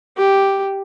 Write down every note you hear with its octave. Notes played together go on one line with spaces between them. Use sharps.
G4